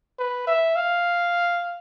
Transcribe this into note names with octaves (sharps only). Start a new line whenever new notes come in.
B4
E5
F5